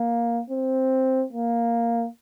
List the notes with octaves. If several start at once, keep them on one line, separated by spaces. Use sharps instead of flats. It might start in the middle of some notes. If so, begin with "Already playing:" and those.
Already playing: A#3
C4
A#3